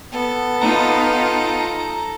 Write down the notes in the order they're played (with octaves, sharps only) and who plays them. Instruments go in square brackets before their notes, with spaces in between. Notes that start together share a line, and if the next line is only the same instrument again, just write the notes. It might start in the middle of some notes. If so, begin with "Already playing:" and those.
[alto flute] B3 [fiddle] A4
[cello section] D#4 F4 [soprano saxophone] A#5